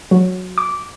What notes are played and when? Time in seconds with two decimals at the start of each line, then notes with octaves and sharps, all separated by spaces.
0.11 F#3
0.58 D6